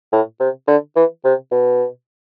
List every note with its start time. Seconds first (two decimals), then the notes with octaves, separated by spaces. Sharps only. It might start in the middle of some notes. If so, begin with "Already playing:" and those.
0.12 A2
0.40 C3
0.67 D3
0.96 E3
1.25 C3
1.51 B2